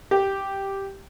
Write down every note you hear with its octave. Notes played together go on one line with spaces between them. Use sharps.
G4